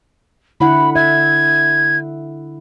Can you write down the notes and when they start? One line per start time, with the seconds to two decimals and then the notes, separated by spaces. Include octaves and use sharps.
0.60 D3 E4 F#5 B5
0.95 E5 G#6